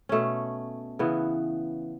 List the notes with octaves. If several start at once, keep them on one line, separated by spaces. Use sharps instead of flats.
B2 A3 C#4
C#3 E3 B3